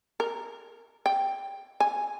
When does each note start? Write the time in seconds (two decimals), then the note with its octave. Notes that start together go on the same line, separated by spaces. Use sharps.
0.20 A#4
1.06 G5
1.80 G#5